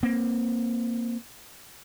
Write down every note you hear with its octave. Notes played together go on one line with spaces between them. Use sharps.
A#3 C4